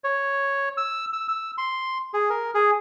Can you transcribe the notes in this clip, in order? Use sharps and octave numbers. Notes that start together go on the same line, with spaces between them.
C#5
E6
E6
E6
C6
G#4
A#4
G#4